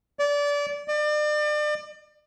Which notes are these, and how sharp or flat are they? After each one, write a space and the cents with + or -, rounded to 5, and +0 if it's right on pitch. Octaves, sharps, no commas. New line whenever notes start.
D5 -25
D5 +35